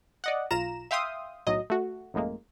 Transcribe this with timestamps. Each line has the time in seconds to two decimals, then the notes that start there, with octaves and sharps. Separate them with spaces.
0.24 D5 D#5 F#5
0.51 B1 F4 A#5 E7
0.91 E5 F5 G5 C6 D#6
1.47 B1 A2 F#3 D#5
1.70 A3 F#4
2.14 A1 F#2 A2 G#3 A#3